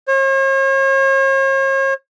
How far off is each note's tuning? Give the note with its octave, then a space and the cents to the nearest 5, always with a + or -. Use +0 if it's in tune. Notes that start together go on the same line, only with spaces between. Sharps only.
C#5 -45